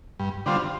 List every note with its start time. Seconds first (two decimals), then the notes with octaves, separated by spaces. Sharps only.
0.19 G2
0.46 D3 G3 C4 F4